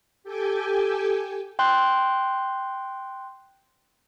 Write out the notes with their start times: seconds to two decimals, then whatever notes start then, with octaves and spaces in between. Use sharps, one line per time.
0.23 G4 A4 G5 G#5
1.59 G5 C6 F#6